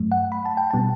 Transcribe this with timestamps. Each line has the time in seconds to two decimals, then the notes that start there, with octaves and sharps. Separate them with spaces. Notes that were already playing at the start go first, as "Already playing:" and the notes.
Already playing: G2 F#3 A3
0.12 F#5
0.32 B5
0.45 A5
0.57 G5
0.71 B2 G3 B3 A5